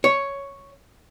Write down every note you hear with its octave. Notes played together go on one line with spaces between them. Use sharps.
C#5